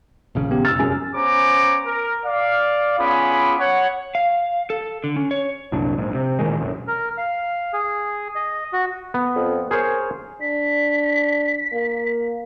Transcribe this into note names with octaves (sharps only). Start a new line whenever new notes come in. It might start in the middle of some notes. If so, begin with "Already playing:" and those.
D#1 A#1 C#3
B3 G4
F1 E6 F6 A6
F#2 G#4
B3 C#4 C5 A#5 D6
A#4
D5 F5
B3 C#4 F4 G#4 B5 D6
C#5 F#5
F5
A4
D3
C#4
C#5
C2 F#2 A#2 D4
A#1 G#2
C3
A1 A#2 D#3 G#3
E1 B1 F#2
A#4
F5
G#4
D#5
F#4
B3
F2
G#4 A#4 C5 C#5
D4 B6
A#3